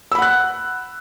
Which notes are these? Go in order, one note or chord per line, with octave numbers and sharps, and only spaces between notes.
F#5 B5 E6 F#6